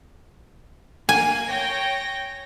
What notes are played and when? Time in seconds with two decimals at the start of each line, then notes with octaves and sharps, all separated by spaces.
1.09 A#3 G#5
1.48 C#5 G5 A#6